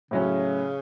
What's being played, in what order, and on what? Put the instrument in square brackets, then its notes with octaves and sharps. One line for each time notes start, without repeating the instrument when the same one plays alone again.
[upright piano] A2 F#3 C#4 [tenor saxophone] C#3